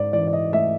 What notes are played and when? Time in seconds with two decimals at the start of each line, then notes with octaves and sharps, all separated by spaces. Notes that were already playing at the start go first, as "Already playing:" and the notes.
Already playing: G#2 D5
0.13 E3 D5
0.28 D5
0.33 D#5
0.53 A3 E5